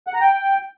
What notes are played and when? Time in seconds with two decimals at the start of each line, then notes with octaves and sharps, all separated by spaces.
0.07 F#5
0.14 A#5
0.21 G5